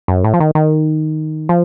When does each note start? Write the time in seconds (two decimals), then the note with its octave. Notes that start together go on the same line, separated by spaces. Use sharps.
0.08 F#2
0.24 A2
0.34 F3
0.40 D#3
0.55 D#3
1.49 F3